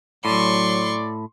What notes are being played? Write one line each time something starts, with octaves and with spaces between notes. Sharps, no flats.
A2 F#3 D5 C6 C#6